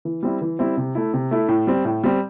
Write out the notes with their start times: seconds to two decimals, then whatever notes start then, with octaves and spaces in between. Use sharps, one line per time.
0.05 E3
0.23 G3 C4 E4
0.41 E3
0.59 G3 C4 E4
0.77 C3
0.95 A3 E4
1.14 C3
1.31 A3 E4
1.48 A2
1.67 G3 C4
1.85 A2
2.04 G3 C4